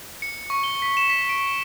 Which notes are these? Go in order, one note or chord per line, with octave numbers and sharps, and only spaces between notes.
C#7
C#6
G7
B6
E7
B6
D7